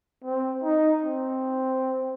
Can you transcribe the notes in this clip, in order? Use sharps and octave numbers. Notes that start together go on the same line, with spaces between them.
C4
D#4
C4